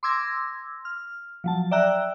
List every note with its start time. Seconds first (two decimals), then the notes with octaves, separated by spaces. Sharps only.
0.03 C6 D6 E6 G#6 A#6
0.85 F6
1.44 F3 F#3 A5
1.71 D5 E5 G5 A#5 E6 F#6